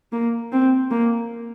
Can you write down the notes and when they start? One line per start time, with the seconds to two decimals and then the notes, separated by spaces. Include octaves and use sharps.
0.12 A#3
0.52 C4
0.91 A#3